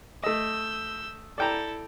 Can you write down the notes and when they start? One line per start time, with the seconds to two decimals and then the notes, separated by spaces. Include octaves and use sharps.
0.24 A3 D#5 E6 G6
1.38 E4 A4 D5 G5 A#5